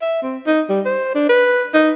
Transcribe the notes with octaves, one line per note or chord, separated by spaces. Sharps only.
E5
C4
D#4
G3
C5
D4
B4
D#4